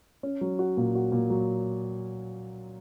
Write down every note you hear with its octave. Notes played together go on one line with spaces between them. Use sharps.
C#4
F#3
F#4
A#2
F#4
A#2
F#3